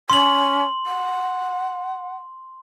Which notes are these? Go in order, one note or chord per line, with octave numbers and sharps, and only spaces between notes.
C#4 C6 F#7
F#5